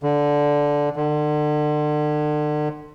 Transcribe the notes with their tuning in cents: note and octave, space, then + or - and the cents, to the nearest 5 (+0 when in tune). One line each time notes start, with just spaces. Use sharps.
D3 -10
D3 +35